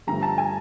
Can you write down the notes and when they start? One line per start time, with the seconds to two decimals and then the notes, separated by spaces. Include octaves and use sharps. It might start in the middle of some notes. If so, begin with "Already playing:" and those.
0.07 G2 D3 F3 A3 A#5
0.23 A5
0.38 G#5